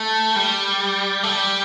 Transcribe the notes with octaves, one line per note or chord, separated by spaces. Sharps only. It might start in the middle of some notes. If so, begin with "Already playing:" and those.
Already playing: A3
G3
A3
G3